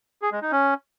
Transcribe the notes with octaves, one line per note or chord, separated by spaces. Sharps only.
G#4
G#3
D#4
C#4